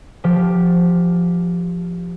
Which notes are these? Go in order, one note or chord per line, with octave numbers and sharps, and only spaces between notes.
F3 G4